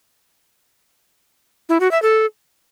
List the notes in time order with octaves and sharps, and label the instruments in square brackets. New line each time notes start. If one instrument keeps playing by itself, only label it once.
[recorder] E4
F#4
E5
A4